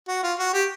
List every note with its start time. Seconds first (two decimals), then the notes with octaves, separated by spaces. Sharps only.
0.08 F#4
0.23 F4
0.39 F#4
0.53 G4